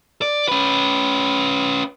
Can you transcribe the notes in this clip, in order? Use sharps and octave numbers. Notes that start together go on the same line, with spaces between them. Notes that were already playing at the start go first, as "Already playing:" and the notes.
D5
C#4 B4